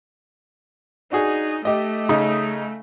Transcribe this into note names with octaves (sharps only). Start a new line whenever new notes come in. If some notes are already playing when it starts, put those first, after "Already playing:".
D4 D#4 F#4 G#4
A3 G4 D#5
C#3 D#4 D#6